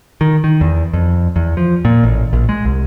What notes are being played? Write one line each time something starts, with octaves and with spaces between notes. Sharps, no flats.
D#3
D#3
E2
F2
E2
F3
A#2
A1
A#1
G#3
C2